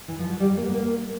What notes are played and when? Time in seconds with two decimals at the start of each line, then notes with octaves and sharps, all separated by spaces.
0.08 E3
0.19 F3
0.30 F#3
0.40 G3
0.57 A#3
0.65 B3
0.74 A#3